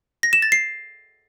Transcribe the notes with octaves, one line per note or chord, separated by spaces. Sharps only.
A#6
E7
A6
C7